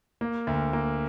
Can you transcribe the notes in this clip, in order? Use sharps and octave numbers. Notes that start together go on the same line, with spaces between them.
A#3
D2
A#3